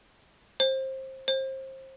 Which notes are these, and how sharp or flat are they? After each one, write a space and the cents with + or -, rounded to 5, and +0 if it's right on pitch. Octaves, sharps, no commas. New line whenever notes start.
C5 +20
C5 +25